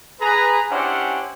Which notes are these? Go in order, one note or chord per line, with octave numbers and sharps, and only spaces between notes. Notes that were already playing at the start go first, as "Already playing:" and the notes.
G#4 B4 A#5
C#4 D4 E4 G4 C5 F#5